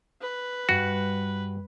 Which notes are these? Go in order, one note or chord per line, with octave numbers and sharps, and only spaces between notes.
B4
G2 F#4